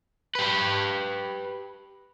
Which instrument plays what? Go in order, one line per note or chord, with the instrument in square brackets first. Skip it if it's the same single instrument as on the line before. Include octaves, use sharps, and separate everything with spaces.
[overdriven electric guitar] G4 B4